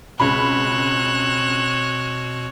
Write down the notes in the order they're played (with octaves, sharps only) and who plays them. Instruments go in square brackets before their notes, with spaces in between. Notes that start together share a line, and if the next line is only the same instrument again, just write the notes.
[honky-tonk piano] C#2 B5 [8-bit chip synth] B2 [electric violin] C4 C#5 [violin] F#6 E7